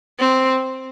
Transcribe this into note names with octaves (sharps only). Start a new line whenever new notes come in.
C4